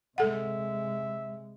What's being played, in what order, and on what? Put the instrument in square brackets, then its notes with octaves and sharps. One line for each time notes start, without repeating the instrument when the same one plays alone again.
[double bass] C3 G#3 [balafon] A4 F#5 [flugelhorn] E5